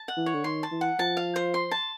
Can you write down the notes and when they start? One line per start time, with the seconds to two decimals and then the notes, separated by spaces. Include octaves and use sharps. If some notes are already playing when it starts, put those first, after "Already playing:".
Already playing: A5
0.08 F#5
0.17 E3
0.26 C#5
0.34 D3
0.44 D#3 C6
0.63 A5
0.71 E3
0.81 F#5
0.99 F3 A5
1.17 F5
1.36 C5
1.54 C6
1.71 A5